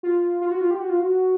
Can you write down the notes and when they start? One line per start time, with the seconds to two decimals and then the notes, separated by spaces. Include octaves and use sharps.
0.03 F4
0.41 F4
0.51 F#4
0.61 F4
0.71 G4
0.80 F#4
0.90 F4
1.00 F#4